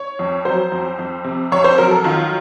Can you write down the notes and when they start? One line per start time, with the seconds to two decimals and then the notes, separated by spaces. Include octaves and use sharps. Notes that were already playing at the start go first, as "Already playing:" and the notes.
Already playing: C#5
0.19 F2
0.45 F#3 C5
0.72 F2
0.99 F2
1.24 C3
1.52 F2 C#5
1.64 C5
1.78 F#3 A#4
1.91 A4
2.04 D#3 F4